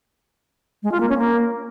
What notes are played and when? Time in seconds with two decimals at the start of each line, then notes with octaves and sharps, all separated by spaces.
0.83 G#3
0.92 F4
1.00 A#3
1.09 C#4
1.18 A#3